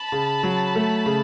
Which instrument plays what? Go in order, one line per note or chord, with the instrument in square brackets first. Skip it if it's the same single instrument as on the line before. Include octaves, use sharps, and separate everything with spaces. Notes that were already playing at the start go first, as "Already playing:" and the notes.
Already playing: [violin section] A5 B5
[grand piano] C#3
F#3
A3
C#3